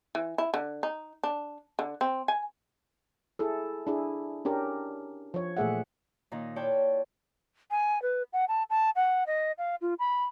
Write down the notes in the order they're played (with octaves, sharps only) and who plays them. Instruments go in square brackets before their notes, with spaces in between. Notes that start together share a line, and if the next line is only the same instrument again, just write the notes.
[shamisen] E3
E4
D3
D#4
D4
D3
C4
G#5
[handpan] E4 G#4 A4
D4 E4 G#4
C#4 D4 G4 A#4
F3 C#5
A#2 E3 A3 G#4 E5 F#5
[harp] A#2 D#3 D#4 D#5
E4 F4 C#5 D5 G5 A5
[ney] G#5
B4
F#5
A5
A5
F#5
D#5
F5
F4
B5